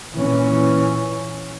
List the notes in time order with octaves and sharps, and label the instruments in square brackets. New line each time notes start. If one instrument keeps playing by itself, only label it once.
[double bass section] A#2 E3 C#4